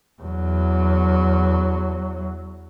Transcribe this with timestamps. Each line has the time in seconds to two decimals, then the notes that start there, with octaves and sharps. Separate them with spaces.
0.22 E2 F#3